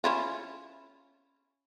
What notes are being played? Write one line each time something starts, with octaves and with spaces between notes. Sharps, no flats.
C#4 E4 F4